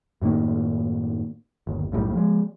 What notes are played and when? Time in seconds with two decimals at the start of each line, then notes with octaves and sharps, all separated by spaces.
0.22 F#2 A2 D#3 A#3
1.67 G1 D#2
1.92 B1 F#2 A2 G3
2.14 F3 G#3